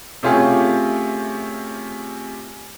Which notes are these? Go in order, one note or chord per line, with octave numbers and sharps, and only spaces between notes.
C3 A3 C#4 F4 G4 G#4